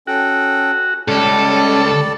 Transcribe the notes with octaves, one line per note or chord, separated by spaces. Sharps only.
C#4 F#4 A4 G5
C#2 G3 C#4 A4 D5